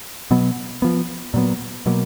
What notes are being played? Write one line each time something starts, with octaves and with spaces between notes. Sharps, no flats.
B2 F#3 B3
F3 B3
A#2 F#3 B3
B2 F#3 A#3